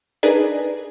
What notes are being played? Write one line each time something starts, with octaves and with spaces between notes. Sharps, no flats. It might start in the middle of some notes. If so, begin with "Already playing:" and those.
D4 D#4 G#4 A#4 B4 D5